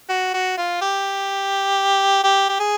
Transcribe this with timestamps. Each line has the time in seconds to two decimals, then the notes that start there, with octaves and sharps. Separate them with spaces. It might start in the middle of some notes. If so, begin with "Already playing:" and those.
0.09 F#4
0.34 F#4
0.58 F4
0.82 G4
2.24 G4
2.49 G4
2.60 G#4